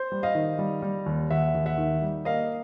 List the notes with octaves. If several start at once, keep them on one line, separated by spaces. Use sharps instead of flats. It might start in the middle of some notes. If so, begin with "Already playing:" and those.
Already playing: C5
G3
D#5 F5
D#3
G3
G3
D#2
D#2 E5 F#5
D#2
E5 F#5
D#3
G3
A#3 D#5 F5